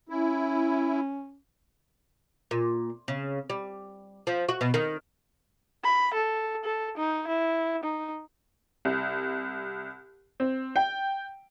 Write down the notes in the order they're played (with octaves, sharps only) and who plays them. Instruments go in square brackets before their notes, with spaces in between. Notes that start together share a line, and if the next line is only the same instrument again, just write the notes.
[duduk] C#4 [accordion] E4
[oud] A#2
C#3
G3
F3
F#4
B2
D#3
[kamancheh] B5
A4
A4
D#4
E4
D#4
[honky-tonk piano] C2
C4
G5